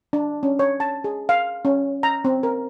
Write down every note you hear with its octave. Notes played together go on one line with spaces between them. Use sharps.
D4
C#4
C#5
A5
G#4
F5
C#4
A#5
C4
A#4